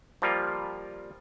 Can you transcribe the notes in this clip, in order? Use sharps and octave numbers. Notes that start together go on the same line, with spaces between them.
F3 G3 A#3 F4